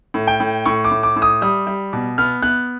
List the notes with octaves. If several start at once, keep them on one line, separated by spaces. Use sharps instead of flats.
A2
G5
A2
A2 C#6
D6
A2
D6
A2
D#6
G3 D#6
G3
B2
B3 F6
B3 F#6